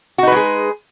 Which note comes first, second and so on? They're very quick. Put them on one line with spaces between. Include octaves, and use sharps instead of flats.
F#4 D#4 B4 G#3 G#4